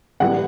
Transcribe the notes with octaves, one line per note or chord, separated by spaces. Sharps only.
A2 E3 G3 F#5